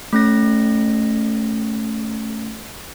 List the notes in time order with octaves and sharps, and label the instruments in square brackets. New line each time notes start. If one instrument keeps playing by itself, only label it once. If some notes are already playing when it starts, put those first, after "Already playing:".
[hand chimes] A3 C#4 A#6